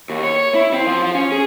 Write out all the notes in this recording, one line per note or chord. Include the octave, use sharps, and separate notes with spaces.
D#2
C#5
C#5
E4
C4
F3
F3
C#4
G#4